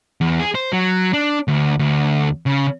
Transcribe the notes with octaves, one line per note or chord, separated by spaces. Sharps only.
E2
G#4
C5
F#3
D4
D2
D2
C#3